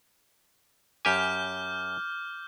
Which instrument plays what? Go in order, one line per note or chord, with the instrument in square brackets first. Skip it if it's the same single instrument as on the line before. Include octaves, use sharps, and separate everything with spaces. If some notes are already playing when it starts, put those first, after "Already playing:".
[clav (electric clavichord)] F#2 G4 G#5 [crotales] D6 F6 G6